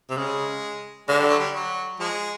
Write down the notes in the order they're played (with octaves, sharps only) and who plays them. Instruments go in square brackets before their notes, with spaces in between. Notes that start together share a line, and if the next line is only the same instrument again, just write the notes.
[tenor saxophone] C3
[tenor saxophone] C#3 [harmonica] G#3
[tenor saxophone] D3 [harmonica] G#3
[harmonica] G3
F#3
G3
F#3
[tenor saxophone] F3 [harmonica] G#3